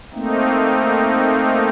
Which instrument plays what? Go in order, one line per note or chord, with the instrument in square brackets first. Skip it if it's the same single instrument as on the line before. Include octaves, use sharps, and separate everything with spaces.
[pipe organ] A3 A#3 C4 D#4